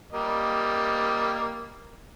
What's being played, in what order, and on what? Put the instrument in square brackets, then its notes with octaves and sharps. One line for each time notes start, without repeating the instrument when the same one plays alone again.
[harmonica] G3 A#3 D#5